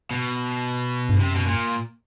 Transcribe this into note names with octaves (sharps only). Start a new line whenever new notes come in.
B2
G2
F#2 C3
B2
A#2